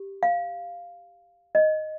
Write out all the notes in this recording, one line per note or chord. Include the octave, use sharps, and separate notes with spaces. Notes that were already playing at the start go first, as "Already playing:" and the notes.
Already playing: G4
F5
D#5